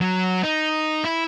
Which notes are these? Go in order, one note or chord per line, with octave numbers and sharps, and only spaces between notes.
F#3
D#4
E4